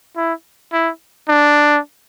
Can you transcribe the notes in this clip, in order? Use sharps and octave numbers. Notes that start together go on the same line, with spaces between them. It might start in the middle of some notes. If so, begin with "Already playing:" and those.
E4
E4
D4